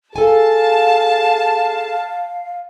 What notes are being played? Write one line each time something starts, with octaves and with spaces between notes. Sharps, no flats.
G#4 A4 F5 G#5 A5